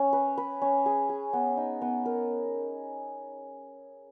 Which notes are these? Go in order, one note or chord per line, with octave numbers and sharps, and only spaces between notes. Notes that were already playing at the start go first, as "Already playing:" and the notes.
Already playing: C#4
B4
B4
C#4
G#4
G#4
B3
D#4
B3
A#4